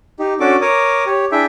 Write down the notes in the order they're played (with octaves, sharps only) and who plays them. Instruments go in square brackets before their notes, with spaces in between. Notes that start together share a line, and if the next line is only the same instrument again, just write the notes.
[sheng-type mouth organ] D#4 G4
C#4 D4 F#4 A4 D6
A#4 C#5 D6 D#6
G4 C#5
D4 E4 G#4 E5 G5